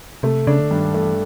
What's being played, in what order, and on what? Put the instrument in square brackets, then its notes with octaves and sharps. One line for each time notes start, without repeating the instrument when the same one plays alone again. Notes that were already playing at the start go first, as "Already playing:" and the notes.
[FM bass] C3 [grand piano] A3
[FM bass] C#3 [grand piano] D4
[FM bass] D3
[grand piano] G2 [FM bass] D#3
[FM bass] E3 [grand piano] A3